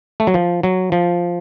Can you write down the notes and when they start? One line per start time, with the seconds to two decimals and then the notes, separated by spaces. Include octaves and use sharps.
0.20 A3
0.27 F#3
0.34 F3
0.63 F#3
0.92 F3